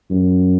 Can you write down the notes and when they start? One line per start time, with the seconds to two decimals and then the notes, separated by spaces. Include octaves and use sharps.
0.10 F#2